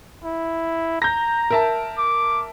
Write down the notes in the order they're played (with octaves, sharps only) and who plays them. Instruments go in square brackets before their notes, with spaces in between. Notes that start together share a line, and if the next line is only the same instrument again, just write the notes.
[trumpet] E4
[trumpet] A#5 [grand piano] G6 A#6
[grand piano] A#4 E5 A5
[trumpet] D6